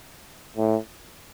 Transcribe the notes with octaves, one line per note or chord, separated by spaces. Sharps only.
A2